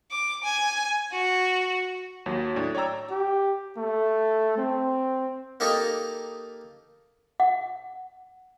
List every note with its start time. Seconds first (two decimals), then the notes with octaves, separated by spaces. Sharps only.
0.11 D6
0.44 G#5
1.12 F#4
2.26 D#2 F#3
2.56 A2 D4
2.75 C#5 D5 G5 A#5 E6
3.11 G4
3.77 A3
4.57 C4
5.60 A#3 D#4 G4 A4 D#5
7.40 F#5